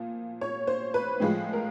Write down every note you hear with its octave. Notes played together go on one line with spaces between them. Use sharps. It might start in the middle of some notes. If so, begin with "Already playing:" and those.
Already playing: A#2 F3
C#5
C5
B4
A2 F3 G#3
A#4